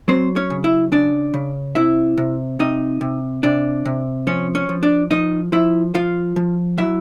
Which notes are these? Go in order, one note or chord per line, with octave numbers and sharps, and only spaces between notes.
F#3 C4 C5
C#4 C#5
C#3
E4 E5
C#3 D4 D5
C#3
C3 E4 E5
C3
C3 D#4 D#5
C3
C3 D4 D5
C3
F3 C#4 C#5
C#4 C#5
F3
D4 D5
F3 D#4 D#5
F3 E4 E5
F3 F4 F5
F3
F#3 E4 E5